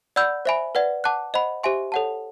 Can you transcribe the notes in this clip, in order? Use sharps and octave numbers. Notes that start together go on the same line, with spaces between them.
D5 F#5 B5 E6 G6
C5 E5 G#5 B5
B4 D5 F#5
F#5 A5 D6 F#6
C5 D#5 F#5 B5
G4 C5 E5 G#5 C6
A4 C#5 F#5 A5